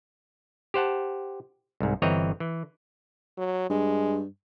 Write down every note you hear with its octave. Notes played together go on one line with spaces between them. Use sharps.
G4 C5 F#5 A5
C2 G#2
G1 E3 C4 C#5 D#5 A#5
E3
F#3
G2 G#3